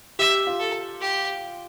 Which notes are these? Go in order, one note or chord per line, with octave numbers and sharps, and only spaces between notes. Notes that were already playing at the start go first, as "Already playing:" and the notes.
G4 E5
F4
A4
G4